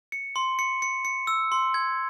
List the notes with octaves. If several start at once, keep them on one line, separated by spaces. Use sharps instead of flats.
C#7
C6
C#7
C#7
C#7
E6
C6
G#6